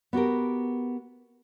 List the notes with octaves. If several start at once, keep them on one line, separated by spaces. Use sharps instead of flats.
B3 F#4 G4 A#4